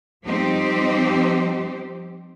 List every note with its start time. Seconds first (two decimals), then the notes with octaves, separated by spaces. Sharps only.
0.23 F3 G3 C4 D#4 G4 C5